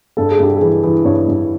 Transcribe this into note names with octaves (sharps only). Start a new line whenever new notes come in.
G2 A4
G#4
G2 G4
G#4
E3
E3
G2 C#5
G2